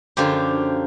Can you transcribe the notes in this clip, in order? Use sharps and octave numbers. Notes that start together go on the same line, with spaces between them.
F#2 D3 F3 F4 G4